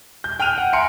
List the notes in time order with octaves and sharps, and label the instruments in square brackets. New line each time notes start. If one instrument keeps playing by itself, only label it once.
[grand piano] G6
G5 F6 F#6 D#7 F7
F#5
E5 G#5 A#5 C6 C#7 D7